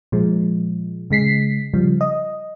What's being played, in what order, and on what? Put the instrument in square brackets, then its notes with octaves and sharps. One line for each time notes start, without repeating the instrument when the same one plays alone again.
[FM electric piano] A#2 F3 G#3
C#3 G#3 B6 C7
C#3 F3 G3
D#5